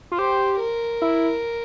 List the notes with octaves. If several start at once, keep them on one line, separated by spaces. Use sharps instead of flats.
F4
G4 C5
A#4
E4